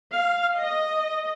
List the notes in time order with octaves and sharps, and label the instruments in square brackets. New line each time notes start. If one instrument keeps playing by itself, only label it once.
[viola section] F5
D#5